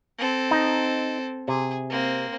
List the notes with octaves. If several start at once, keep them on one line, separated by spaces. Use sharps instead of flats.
C4 A4
D#4
C3 G#4
A#3 C4